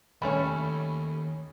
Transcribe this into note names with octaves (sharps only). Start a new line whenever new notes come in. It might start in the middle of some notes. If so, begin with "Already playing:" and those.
D#2 G3 A3 C#4 C#5 G#5 B5